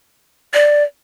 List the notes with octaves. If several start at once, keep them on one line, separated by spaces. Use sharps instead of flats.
D5